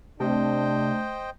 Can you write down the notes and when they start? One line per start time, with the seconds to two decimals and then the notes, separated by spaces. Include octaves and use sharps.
0.20 C3 A3 D4 C5 D#5 G5